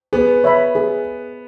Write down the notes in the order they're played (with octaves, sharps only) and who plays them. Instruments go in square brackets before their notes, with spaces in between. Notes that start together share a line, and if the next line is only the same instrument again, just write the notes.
[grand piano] B3 [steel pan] G#4
[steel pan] C#5 E5 B5
G#4